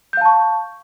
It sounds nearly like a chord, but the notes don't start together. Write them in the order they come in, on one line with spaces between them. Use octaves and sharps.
G6 F5 A5 C#6